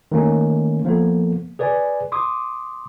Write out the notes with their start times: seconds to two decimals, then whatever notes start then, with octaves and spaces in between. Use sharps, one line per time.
0.12 D#3 A3 A#3 C#4
0.85 F3 A#3 B3 A4
1.59 G#4 B4 D5 G#5
2.12 C6 D6 D#6